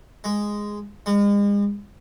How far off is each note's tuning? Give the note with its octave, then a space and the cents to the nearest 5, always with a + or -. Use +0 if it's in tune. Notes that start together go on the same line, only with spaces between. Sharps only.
G#3 -5
G#3 -40